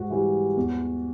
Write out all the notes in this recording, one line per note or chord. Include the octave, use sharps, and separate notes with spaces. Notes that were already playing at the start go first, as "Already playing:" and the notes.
Already playing: G#2 F#4
E3 G3
E2